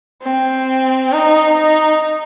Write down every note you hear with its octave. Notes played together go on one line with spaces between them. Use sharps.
C4
D#4
D#4